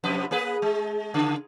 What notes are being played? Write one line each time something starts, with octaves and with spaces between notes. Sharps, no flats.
F2 C3 B4
A#3 G#4 B4
G#3
C#3